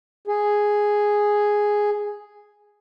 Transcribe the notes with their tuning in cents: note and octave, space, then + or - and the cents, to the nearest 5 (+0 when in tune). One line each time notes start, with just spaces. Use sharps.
G#4 +0